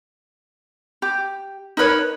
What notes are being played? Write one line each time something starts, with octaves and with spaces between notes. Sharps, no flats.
G4
D#4 A#4 B4 C#5